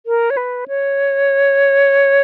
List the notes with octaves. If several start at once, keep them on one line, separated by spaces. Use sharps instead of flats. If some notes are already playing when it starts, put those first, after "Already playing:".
A#4
C#5
B4
C#5